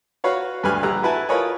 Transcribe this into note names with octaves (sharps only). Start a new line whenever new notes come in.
F#4 B4 C#5 F5
D2 G2 G3 B4 G#5 F6
A#1 G4 A#5 E6 F#6
E4 F#4 B4 G#5 A5
F4 A#4 B4 C#5 D#5 G#5